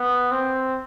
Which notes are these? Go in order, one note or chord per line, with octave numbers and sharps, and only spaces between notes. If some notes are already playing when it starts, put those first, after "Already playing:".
Already playing: B3
C4